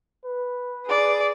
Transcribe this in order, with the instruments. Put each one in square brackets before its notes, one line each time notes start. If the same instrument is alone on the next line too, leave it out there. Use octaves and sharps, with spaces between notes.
[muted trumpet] B4
[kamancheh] G#4 D5